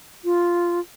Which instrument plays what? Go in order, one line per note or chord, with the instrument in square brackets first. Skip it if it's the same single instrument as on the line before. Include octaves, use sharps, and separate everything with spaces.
[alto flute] F4